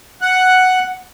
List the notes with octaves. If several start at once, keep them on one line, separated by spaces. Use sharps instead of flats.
F#5